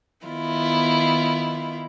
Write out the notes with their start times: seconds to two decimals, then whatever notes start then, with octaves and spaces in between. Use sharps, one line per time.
0.25 D#3 B3 E4 F4